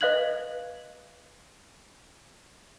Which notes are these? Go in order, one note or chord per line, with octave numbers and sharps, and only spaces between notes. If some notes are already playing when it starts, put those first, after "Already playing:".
B4 D#5 F5 F#6 G#6 F#7